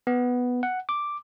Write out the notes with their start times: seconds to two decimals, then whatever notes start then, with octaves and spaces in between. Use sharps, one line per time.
0.07 B3
0.63 F#5
0.89 D6